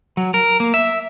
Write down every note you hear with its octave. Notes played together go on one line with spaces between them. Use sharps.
F#3
A#4
A#3
E5